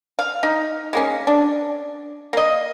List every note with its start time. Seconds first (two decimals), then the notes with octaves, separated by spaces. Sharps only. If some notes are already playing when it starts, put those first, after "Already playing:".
0.19 F5
0.43 D#4
0.93 G#3 A#3 C#4
1.27 D4
2.33 A#3 D#5